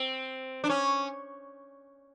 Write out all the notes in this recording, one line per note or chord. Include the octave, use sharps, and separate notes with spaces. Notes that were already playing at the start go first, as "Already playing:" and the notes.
Already playing: C4
D4
C#4